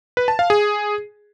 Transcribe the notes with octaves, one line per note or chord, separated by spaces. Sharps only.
B4
A5
F5
G#4